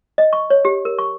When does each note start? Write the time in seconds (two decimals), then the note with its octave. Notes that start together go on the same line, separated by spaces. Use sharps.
0.18 D#5
0.33 C#6
0.50 C#5
0.65 G4
0.85 A#4
0.99 C#6